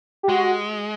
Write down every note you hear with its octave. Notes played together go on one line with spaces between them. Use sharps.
G4
G#3 F#4